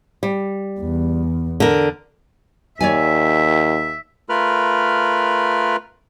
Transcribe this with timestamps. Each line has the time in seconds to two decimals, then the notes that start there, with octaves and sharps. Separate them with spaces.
0.23 G3
0.80 E2
1.60 D3 A#4
2.81 D#2 C#5 D5 E5 G#5
4.29 A3 F4 A#4 B4 B5 F6